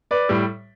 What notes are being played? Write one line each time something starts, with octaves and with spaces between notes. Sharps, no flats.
B4 D5
A2 G3